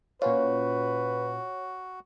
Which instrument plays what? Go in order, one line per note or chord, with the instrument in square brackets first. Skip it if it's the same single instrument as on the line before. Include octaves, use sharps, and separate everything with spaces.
[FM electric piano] A#2 C#4 F4 [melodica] F#4 [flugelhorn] B4 [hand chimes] C#5